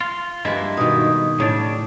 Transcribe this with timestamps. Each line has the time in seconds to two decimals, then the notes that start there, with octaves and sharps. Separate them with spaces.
0.01 F4
0.45 G2 G#3 A#3 E4 B4
0.77 B2 D#3 D#6
1.40 A2 C#3 D4